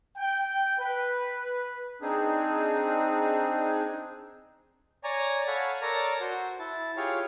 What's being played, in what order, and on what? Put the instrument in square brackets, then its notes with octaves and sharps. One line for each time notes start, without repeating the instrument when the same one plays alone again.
[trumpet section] G5
B4
[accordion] C4 D4 D#4 G#4
[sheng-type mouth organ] C#5 D5 G#5 A#5
A4 C#5 F5 F#5 G#5 B5
A4 A#4 C#5 D5 A#5
F#4 C5
E4 A5
F4 G4 G#4 C#5 F5